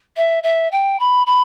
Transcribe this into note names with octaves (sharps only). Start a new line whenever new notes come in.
E5
E5
G5
B5
B5